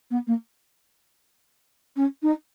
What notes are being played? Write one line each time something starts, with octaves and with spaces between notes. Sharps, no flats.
B3
A#3
C#4
D#4